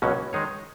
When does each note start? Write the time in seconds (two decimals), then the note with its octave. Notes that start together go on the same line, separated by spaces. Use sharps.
0.02 C#2 B2 F#3 A#3 C#4
0.33 D#3 G#3 D#4 G#4 C#5